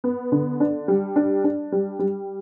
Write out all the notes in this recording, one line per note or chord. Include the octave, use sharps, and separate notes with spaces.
B3
D3
D4
G3
D4
D4
G3
G3